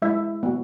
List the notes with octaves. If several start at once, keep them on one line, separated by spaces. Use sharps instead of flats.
G#3 E4 E5
B3 F#4